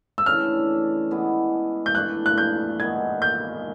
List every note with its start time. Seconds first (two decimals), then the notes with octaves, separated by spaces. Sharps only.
0.18 E6
0.26 C#3 E3 A3 D4 F6
1.11 E3 G#3 B3 E4
1.86 G6
1.95 E3 A3 D4 F#6
2.26 F#6
2.38 G6
2.80 D#3 G#3 B3 G#6
3.22 G6